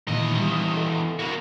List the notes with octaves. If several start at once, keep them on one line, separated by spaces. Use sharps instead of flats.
E2 A#2 D#3 D#5
G3
A4
A#3 F#4